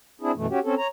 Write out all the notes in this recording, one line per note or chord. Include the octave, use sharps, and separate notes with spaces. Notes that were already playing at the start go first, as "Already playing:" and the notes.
C4 D4 E4 G#4
F#2 B2 E3 A3
C#4 F#4 G4
C4 C#4 A4
C#5 A#5